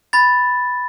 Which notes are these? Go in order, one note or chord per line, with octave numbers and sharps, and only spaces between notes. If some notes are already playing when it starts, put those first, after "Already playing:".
B5 A6